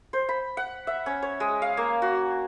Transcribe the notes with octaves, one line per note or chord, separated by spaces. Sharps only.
C5
B5
F#5
E5
C#4
C#5
G#3
F5
A#3
F#4